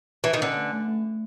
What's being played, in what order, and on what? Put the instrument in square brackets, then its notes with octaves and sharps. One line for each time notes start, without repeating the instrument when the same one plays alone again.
[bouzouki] E3
D#3
[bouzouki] D3 [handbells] C#4
[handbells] A3
A3
A3
A3